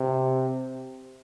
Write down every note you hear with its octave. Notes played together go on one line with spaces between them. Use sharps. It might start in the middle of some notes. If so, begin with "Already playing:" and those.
Already playing: C3